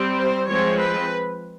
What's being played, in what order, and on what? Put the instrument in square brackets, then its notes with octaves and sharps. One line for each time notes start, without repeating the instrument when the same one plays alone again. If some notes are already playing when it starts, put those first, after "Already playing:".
Already playing: [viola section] G3 C4
C5
F3 G#3 C4 C#5
B4